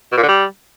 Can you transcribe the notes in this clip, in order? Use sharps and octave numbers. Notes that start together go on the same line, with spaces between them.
B2
A#2
D3
G3